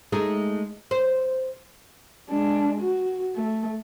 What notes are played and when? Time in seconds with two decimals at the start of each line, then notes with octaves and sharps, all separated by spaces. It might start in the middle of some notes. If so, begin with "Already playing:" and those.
0.12 G#3 A3 D#4
0.91 C5
2.30 G#3 D4
2.81 F#4
3.36 A3